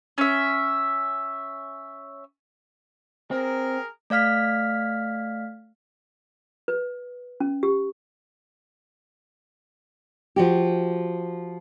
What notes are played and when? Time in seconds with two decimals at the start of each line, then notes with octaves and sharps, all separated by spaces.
0.18 C#4 E5
3.31 C4 G#4 A#4
4.10 A3 D5 F5 F6 B6
6.68 B4
7.40 C#4
7.63 G4
10.36 F3 F#4 G4